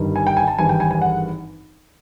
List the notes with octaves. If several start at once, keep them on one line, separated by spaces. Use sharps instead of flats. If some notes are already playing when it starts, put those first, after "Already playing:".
Already playing: G1 G2 D#3 G3
G#5
G5
G#5
A5
G#1 G2 E3 G3 G#5
G5
G#5
G#5
F#5